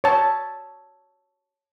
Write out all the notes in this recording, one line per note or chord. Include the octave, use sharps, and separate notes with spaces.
C#5 A5